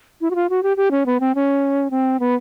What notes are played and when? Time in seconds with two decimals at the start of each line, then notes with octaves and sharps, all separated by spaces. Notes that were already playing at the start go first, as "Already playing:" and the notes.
0.21 E4
0.31 F#4
0.35 F4
0.50 F#4
0.63 G4
0.77 G4
0.91 C#4
1.06 B3
1.20 C4
1.35 C#4
1.91 C4
2.20 B3